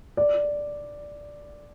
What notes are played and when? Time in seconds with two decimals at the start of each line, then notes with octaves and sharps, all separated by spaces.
0.17 D5